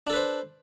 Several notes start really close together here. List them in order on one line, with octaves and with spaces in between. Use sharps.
D4 A4 B4 C5